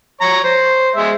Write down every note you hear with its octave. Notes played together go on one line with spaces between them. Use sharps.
C#5 A#5 C#6
C5
G#3 E5